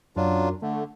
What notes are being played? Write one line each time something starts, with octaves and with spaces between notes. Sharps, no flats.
F#2 F#3 D4 F4
D3 A3